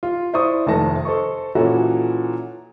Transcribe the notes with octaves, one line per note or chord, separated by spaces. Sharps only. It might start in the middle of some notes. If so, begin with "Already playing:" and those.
F4
E4 C5 D5 C#6 D#6
F1 D#3 A3 A5 A#6
A4 C5 D#5 C#6
A#2 E3 C#4 E4 F#4 A4